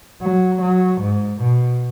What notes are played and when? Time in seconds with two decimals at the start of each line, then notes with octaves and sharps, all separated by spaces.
0.22 F#3
0.62 F#3
1.01 G#2
1.40 B2